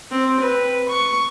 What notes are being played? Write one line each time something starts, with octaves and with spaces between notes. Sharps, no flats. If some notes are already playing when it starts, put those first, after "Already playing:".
C4
B4
C#6